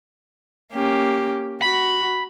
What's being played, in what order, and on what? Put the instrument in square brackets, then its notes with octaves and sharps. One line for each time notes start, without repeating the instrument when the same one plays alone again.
[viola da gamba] A#3 C#4 G4
[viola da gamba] F#4 [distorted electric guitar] B5